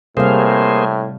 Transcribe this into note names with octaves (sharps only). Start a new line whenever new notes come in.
A2 C3 G3 A#3 G#4 C5 F5